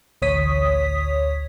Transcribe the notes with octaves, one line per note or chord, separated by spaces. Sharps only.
A1 D2 C#5 D#6 B6